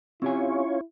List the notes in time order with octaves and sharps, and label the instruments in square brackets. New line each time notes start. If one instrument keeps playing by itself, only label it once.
[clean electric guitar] C4 G4 G#5 [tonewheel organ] C#4 F4 C#5 [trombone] E4